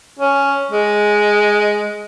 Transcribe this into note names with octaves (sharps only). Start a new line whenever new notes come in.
C#4
G#3